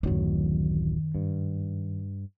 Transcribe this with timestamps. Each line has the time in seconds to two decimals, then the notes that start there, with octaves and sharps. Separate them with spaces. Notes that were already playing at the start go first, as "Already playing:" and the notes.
0.03 D1 A1 F#2 D#3 F#3
1.15 G2